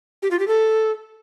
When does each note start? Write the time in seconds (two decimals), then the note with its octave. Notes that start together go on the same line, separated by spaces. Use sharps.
0.23 G4
0.31 F4
0.39 G4
0.48 A4